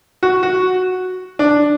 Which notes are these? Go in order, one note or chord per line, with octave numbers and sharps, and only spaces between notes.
F#4
F#4
D4